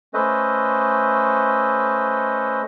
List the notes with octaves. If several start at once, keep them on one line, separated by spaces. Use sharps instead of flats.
A3 C#4 A4 B4 C5 D#5